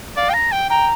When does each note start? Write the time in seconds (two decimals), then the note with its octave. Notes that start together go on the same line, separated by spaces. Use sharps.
0.16 D5 F5
0.30 G5
0.34 A#5
0.52 G5
0.69 G5 A#5